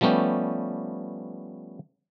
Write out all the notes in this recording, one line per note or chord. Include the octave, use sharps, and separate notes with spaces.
F3 G3 A3 B3 C#4 G4